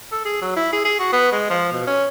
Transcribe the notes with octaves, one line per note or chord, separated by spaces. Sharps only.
A4
G#4
F#3
E4
G#4
G#4
F#4
B3
G#3
F3
B2
C#4